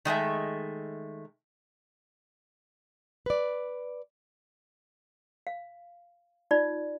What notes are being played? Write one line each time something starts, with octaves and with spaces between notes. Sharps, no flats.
D#3 G#3 A3 E5
B4 D5
F5
D#4 F4 D5